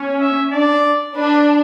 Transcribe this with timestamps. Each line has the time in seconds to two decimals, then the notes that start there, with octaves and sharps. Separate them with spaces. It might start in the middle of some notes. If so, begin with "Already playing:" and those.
Already playing: C#4
0.20 E5
0.52 D4 D5
1.15 D4 B4